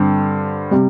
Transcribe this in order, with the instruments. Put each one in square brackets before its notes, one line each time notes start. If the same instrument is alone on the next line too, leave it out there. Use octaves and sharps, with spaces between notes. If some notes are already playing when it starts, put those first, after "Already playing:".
Already playing: [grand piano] G2 D3 C4
C3 G3